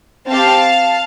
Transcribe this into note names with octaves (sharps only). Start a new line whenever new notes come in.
C4 G4 F5 A5